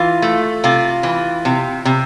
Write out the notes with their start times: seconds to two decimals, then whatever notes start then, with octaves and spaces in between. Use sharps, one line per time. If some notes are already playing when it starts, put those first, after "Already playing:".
Already playing: E3 F4
0.22 A3
0.64 C3 F4
1.03 E3
1.45 C3
1.85 C3